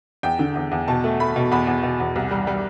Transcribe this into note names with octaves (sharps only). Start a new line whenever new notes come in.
E2 G5
D3
E2
E2
B2 A5
A3
A3 B5
B2
E2 B5
E2
B2
E2
C2
G3
G3